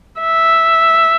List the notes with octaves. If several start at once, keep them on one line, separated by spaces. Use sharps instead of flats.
E5